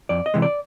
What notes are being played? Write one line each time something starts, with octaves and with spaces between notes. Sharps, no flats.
F2 D5
D#5
C3 E3 G#3
D5